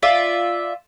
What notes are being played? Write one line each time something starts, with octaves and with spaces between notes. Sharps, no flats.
F4 D5 E5